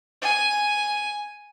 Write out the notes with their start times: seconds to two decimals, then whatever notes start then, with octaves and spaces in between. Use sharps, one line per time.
0.22 G#5